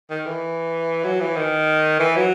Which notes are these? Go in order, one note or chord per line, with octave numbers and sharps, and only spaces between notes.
D#3
E3
F#3
E3
D#3
E3
F#3